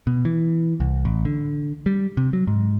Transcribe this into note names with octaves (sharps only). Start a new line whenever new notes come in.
B2
E3
C2
A1
D3
G3
C3
F#3
G#2